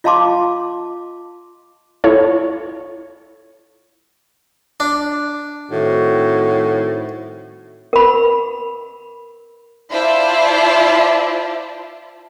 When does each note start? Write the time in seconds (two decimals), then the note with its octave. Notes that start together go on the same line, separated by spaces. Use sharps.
0.04 F4 D#5 F5 A5 C6 D6
2.04 E4 F4 A4 C#5
4.80 D4
5.71 A2 D#3 C4 F#4
7.93 A#4 B5
9.92 E4 F4 C5 D5 E5 A5